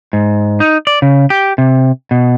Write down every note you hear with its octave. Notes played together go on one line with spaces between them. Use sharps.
G#2
D#4
D5
C#3
G4
C3
B2